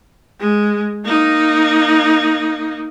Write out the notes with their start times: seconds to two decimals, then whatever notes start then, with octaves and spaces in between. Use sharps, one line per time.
0.40 G#3
1.05 A#3 D#4